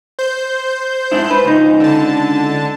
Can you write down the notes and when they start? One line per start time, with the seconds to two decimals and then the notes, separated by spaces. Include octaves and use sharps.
0.19 C5 G6
1.12 G#2 D4 E4
1.30 B4
1.45 C#2 D#4
1.80 D3 A5